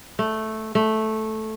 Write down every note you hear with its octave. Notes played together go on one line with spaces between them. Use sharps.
A3
A3